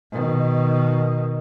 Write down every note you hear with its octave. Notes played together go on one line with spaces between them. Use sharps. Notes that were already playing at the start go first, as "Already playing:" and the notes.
B2 D#3